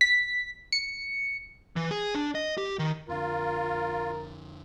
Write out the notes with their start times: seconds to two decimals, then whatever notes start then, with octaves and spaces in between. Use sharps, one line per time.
0.01 B6
0.72 C#7
1.76 E3
1.91 G#4
2.15 D4
2.35 D#5
2.58 G4
2.79 D#3
3.09 F2 D3 F4 A#4